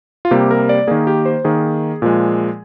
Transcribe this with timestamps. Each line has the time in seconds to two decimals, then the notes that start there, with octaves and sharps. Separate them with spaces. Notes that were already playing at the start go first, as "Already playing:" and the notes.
0.25 F4
0.31 C3 G3 A#3 G4
0.51 A#4
0.69 D5
0.87 D#3 A#3 G#4
1.07 G4
1.25 C5
1.45 D#3 A#3 G#4
2.02 A#2 F3 G#3